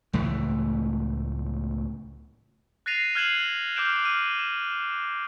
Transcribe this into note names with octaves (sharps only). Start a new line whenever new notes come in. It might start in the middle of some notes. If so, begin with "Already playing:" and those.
C#2 A2 E3 A3
F#6 A6 A#6 C7 D#7 F7
F6 F#6 G#6 C7 E7 F#7
D6 F6 G6 D7 E7
F6 D#7
E7